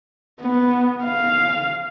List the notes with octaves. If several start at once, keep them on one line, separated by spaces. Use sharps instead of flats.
B3
F5